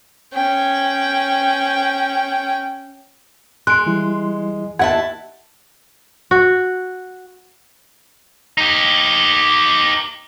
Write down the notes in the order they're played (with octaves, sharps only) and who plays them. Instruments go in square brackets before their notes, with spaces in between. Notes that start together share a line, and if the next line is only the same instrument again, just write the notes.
[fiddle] C#4 G5
[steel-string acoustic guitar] G#3 [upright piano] C6 [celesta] F#6 D7
[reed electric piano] E3 G3 E4
[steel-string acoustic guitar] D#2 E4 A5 [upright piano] F#5 [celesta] G#6
[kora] F#4
[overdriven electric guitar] D#4 G4